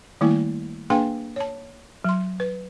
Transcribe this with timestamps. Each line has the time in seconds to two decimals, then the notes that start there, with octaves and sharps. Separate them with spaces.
0.21 D#3 G3 A3 A#3 E4
0.90 A#3 D4 G#4 B4 F5 G5
1.36 C#5 A5
2.04 F#3 C6
2.40 B4